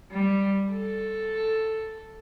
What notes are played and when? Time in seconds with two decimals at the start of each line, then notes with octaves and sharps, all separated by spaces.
0.12 G3
0.72 A4